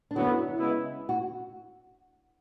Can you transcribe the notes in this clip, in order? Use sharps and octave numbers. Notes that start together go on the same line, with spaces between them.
D4
F#2 D3 F#3 B3 E4
C#3 G#3 B3 E4
F#4